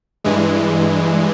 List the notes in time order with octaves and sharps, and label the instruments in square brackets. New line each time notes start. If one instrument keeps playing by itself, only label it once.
[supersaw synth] G2 E3 G#3